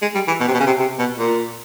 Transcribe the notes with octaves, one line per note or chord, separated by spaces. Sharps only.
G#3
G3
E3
B2
C3
B2
C#3
C3
C3
B2
A#2